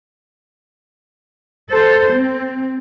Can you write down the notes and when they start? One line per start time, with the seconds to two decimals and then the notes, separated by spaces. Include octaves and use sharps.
1.70 A4 C5
2.11 C4